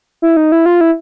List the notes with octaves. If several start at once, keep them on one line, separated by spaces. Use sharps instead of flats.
E4
D#4
E4
F4
E4